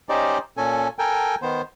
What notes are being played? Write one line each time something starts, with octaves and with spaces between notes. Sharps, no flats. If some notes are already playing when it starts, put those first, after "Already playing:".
C#4 D#4 G4 C5 D5 D#5
A#2 C#4 A4 G#5
A4 A#4 G5 G#5
D#3 B3 C5